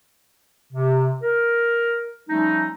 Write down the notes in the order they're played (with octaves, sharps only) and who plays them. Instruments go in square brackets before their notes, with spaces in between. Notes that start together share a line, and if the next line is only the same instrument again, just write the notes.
[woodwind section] C3
A#4
F3 G3 A3 C#4 D#4